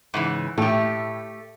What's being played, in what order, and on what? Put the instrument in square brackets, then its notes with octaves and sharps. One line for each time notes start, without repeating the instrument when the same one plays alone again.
[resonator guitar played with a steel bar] G#2 C#3 E3
[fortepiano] A2 [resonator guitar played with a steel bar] A3 G4